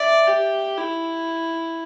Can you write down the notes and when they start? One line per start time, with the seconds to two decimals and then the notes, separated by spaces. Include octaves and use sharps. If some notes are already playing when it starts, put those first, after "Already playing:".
Already playing: D5 E5
0.27 G4
0.78 E4